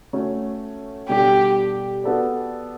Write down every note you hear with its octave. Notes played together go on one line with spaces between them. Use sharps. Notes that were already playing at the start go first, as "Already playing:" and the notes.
A3 C#4 F#4 C#5
B2 G3 D4 F#4 G4 A4
B3 F#4 A4 D5